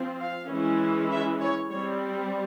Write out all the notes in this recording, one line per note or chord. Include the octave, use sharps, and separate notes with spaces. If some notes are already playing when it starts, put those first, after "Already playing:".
Already playing: F3 C4
F5
E3 G#3 C#4
E5
C#5
G3 C4 C#5